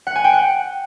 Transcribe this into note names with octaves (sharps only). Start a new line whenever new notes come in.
F#5
G#5
G5
F#5